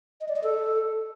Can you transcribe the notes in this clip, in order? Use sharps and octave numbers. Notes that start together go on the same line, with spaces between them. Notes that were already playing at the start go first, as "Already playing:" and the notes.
D#5
D5
D#5
A4